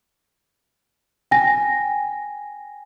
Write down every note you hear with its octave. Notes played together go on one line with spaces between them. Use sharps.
G5 G#5 A#6